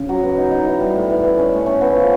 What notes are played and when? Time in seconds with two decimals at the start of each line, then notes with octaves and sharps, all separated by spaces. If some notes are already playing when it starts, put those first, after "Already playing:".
Already playing: C#3
0.09 F#3
0.23 B3
0.38 D#4
0.51 D#4
0.66 E3
0.80 G3
0.94 A2
1.10 E3
1.23 E3
1.38 C#4
1.53 A3
1.66 C#4
1.81 B3
1.96 F3